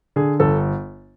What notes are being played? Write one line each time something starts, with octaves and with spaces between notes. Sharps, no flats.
D3 G#4
G1 A4